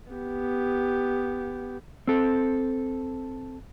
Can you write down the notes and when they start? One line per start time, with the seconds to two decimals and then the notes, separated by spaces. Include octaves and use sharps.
0.13 B3 G4
2.08 C4 A4